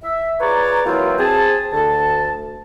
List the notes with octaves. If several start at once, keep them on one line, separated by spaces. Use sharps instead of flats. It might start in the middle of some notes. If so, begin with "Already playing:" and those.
E5
F4 G#4 B4 C#5 D5 A#5
E3 F#3 A#3 C4 F4 F#4
C4 G#4 A5
D2 A5